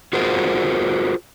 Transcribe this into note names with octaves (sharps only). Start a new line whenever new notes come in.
F4 F#4 G#4 A#4 C5